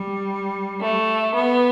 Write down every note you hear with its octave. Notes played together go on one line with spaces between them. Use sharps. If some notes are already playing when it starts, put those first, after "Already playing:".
Already playing: G3
A3
B3